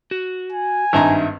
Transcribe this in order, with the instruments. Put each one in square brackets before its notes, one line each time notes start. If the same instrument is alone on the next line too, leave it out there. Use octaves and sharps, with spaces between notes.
[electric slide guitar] F#4
[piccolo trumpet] G#5
[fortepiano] G#1 G2 A#5 [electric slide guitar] D#4 E5